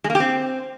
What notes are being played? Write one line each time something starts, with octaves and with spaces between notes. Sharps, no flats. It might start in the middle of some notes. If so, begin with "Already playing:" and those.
G#3
A#3
G4
C4